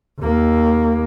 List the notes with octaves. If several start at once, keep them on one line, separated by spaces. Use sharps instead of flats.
D#2 A#3